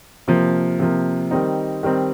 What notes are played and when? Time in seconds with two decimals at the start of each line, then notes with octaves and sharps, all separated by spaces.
0.28 C3 F3 A#3
0.79 C3 F3 A#3
1.31 D#3 G3 C4 D#4
1.83 D#3 G3 C4 D#4